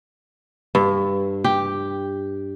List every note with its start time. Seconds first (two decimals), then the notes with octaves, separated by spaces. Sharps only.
0.75 G2
1.44 G4